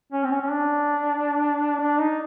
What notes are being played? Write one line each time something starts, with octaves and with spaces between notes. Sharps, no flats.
C#4
C4
C#4
C#4
D4
D4
D#4